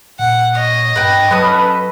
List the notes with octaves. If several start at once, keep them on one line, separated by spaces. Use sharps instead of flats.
A#2 F#5
C#5 D#5
G2 B4 G5
F#3 C#4 A4 B4 D#6